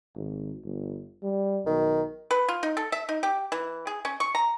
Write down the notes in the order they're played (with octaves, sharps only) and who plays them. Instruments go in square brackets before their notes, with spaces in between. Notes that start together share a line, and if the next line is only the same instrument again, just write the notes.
[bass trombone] G#1
G1
G3
[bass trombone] B1 [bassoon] D#3
[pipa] B4
F4
D#4
A4
E5
D#4
G4
E3
G#4
C#4
C#6
A#5